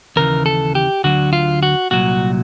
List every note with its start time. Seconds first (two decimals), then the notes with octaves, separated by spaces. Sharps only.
0.16 D#2 C#3 E3 A#4
0.46 A4
0.75 G4
1.04 D2 D3 F#3 F#4
1.33 F4
1.63 F#4
1.91 C2 A#2 F#3 F#4